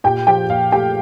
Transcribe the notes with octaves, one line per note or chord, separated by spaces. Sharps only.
A#2 G4 G5
F3 G4 G5
A#2 F5
A3 G4 G5